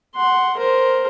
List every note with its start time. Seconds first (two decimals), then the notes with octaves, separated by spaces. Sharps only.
0.16 F#5 C6
0.57 A#4 C5